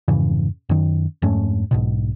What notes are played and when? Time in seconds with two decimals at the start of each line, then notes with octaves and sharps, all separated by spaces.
0.08 F2 G#2 C#3 E3
0.69 F#2 D#3
1.22 F2 G#2 A3 C#4
1.71 B1 G#2 B2